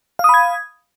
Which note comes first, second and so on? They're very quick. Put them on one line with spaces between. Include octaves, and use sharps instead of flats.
F5 D#6 B5 G#6